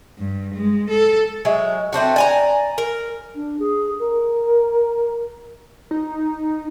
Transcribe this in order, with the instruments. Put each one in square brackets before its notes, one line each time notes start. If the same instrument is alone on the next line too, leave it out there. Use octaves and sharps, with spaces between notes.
[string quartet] G2
G#3
A4
[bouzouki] F#3 G#3 E5
A3 C4 D4 F#4
D5 G#5 A#5
A#4
[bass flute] D4
G#4
A#4
[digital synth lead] D#4